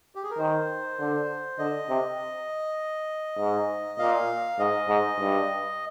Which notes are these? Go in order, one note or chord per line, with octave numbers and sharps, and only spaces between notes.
G4
G#4
A#4
D#3 C5
D3
D3 D#5
C3
G#2
A#2 F5
G#2 D#5
G#2
G2